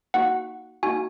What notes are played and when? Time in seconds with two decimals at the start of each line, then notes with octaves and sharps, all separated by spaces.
0.14 A#3 D#4 F#4 F#5
0.83 A#3 D#4 F#4 G#5